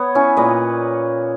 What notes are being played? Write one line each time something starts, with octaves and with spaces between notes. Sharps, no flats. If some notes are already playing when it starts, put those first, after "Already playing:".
Already playing: B3 C#5
C#4 E4
A#2 A#3 B4 D#5